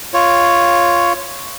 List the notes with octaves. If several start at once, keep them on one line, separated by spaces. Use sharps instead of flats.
F4 C#5